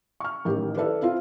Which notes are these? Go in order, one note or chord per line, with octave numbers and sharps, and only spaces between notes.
C#6 F6
A1 D#3 G4 A#4
E4 A4 B4 D5
C4 E4 F4